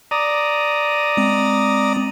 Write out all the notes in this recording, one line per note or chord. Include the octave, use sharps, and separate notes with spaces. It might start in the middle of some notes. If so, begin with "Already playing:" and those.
D5 A#5 D#6
G#3 C4